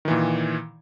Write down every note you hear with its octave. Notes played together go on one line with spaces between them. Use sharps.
A#2 D#3 E3